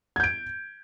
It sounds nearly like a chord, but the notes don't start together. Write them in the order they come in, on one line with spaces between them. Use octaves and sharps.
G#6 G6 D7